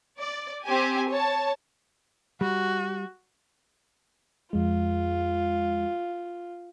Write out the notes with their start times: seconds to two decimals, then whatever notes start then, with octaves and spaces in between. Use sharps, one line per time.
0.18 D5
0.65 C4 G4 G#5
1.09 C#5 A5
2.41 G3 F#4
4.53 F2 G#3 F4